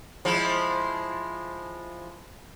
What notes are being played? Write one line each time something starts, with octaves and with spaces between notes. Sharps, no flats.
F3 G#3 E4